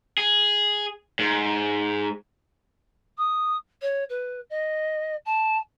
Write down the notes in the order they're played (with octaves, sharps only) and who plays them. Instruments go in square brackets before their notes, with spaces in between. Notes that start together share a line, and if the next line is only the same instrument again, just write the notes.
[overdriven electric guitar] G#4
G#2
[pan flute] D#6
C#5
B4
D#5
A5